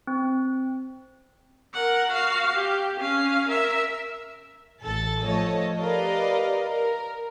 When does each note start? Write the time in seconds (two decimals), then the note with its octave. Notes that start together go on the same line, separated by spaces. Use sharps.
0.07 C4
1.74 A#4 F#5
2.11 F#4 F5
2.53 G4
3.00 C#4 F5
3.49 A#4 E5
4.84 A1 A4 A6
5.23 F3 A3 A4 C#5 D#5
5.80 G4 A#4 B4 D5 D#5 F5
6.68 A#4